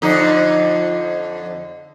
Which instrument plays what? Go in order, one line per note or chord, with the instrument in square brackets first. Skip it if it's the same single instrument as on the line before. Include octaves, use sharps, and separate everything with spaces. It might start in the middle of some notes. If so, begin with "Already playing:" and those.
[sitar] F2 D3 D#4